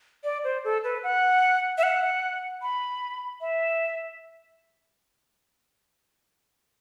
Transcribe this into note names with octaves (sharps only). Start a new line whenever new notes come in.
D5
C5
A4
B4
F#5
E5
F#5
B5
E5